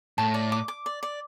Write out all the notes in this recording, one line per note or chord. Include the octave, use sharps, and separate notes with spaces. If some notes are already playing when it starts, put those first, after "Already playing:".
A2 A5
D5
D6
D6
D5
D5